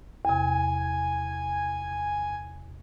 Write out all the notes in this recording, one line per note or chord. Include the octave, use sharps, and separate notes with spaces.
E2 C3 G#5